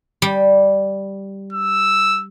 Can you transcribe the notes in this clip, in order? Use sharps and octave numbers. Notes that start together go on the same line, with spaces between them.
G3
E6